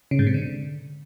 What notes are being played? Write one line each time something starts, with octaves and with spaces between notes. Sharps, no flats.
C#3
G#2
C3
D3